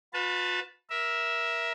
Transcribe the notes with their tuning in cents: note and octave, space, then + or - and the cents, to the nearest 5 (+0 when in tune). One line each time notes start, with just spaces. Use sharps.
F4 +45 B4 +0 A5 +0
A#4 +20 E5 +0